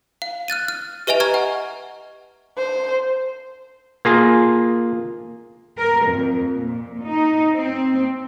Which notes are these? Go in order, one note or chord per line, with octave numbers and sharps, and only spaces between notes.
F5
F6 F#6 A6 D#7
F6
G4 B4 D#5 E5 G#5 F7
D#5 G#5 A#5 C#6 F6 G#6
F#5
C5
A#3 F4 G#4
A#4
F2
A#2
D#4
C4